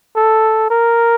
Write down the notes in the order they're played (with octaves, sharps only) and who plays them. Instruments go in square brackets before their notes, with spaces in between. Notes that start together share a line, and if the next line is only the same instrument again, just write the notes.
[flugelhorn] A4
A#4